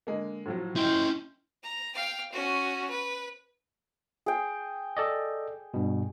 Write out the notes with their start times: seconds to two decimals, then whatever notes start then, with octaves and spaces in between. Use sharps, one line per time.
0.07 D3 G#3 A#3
0.46 A2 F3 F#3
0.76 C#4 E4 D#5 G5 C6 G6
1.63 A#5
1.95 F5 G5
2.32 C#4 F#4
2.90 B4
4.26 G#4 G5
4.97 A4 D5 D#5
5.74 G2 B2